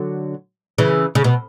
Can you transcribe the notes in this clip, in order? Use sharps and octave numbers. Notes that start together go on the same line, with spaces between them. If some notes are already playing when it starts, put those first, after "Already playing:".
Already playing: D3 F#3
C#3 E3
C#3
B2